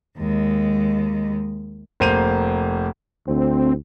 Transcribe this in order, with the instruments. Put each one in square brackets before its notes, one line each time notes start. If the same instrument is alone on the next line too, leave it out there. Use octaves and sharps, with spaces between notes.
[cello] D#2 G#3
[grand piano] F1 A#3 C5 D#7 F7
[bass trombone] D2 [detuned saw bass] C4